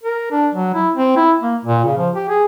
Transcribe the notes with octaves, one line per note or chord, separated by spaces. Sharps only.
A#4
D4
F#3
E4
C4
E4
A#3
A#2
C#3
F3
G4
G#4